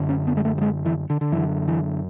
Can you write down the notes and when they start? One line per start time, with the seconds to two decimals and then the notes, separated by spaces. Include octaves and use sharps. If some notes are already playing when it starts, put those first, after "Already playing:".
Already playing: F#2 D3
0.09 C#4
0.27 B3
0.37 G#3
0.45 A3
0.58 F#3
0.61 G#3
0.85 E3
1.10 D3
1.21 D3
1.32 F#2 D3 E3
1.68 E3